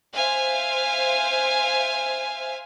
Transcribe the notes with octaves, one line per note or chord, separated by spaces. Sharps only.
C5 E5 F5 G#5